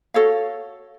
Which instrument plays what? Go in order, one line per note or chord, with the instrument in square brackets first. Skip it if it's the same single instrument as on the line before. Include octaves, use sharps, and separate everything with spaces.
[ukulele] F#4 A4 C#5 F5